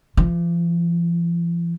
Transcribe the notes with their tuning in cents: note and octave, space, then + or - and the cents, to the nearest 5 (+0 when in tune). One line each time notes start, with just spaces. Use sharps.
F3 -45 F4 +0